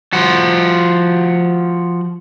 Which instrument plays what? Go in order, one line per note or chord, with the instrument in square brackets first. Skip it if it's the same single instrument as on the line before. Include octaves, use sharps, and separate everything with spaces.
[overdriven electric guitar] F3 F#4